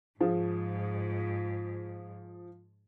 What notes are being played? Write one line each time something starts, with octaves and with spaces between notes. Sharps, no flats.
G#2 F3 G#4